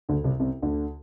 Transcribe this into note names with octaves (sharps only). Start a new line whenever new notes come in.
D2 D3
C2 C3
C2 C3
D2 D3